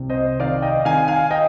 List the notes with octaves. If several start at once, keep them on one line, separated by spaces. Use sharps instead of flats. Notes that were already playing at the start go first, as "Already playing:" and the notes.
Already playing: C2 C3
C5 D#5
D#3 D5 F5
D#5 G5
D#3 F5 G#5
F5 G#5
D#5 G5